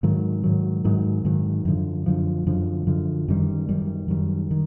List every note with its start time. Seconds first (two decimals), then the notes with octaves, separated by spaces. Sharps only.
0.03 G#2 D#3 F#3
0.44 G#2 D#3 F#3
0.84 G#2 D#3 F#3
1.25 G#2 D#3 F#3
1.65 F#2 D3 F3
2.06 F#2 D3 F3
2.46 F#2 D3 F3
2.87 F#2 D3 F3
3.28 F#2 D#3 G3
3.69 F#2 D#3 G3
4.08 F#2 D#3 G3
4.51 D#3